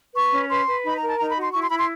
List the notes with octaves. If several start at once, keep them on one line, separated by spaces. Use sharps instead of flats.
B4 C#6
C#4
B4 C6
B4
D#4 B5
A#5
A#4
A5
D#4 A#5
B5
F#4
C6
E4 C#6
C6
E4 B5
C6